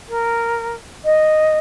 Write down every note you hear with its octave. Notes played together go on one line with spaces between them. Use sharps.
A#4
D#5